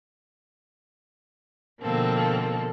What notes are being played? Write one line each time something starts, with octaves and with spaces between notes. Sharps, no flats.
B2 D3 F3 A#3 C4 A4